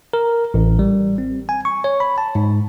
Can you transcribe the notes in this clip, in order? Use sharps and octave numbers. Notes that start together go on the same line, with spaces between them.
A#4
A1
G3
C4
G#5
C#6
C#5
B5
A5
G#2